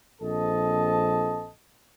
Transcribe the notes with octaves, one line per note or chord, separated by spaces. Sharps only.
A#1 C4 A4 D#5 A5